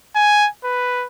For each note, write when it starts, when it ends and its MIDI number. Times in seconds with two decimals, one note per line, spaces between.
0.15 0.48 80
0.64 1.06 71